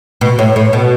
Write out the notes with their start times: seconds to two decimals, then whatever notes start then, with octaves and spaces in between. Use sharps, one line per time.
0.21 B2
0.39 A2
0.56 A2
0.73 B2